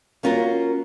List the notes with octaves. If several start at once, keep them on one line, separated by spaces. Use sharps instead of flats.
A#3 C#4 F4 F#4 A#4